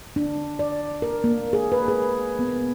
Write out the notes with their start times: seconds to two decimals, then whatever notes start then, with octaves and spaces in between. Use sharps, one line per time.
0.16 D4
0.59 D5
1.02 A#4
1.24 A#3
1.53 G#4
1.72 B4
1.88 G#4
2.39 B3